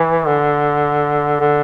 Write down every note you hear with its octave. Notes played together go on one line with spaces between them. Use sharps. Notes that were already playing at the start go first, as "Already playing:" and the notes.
Already playing: E3
D3
D3